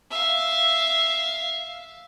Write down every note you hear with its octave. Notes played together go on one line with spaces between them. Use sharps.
E5 F5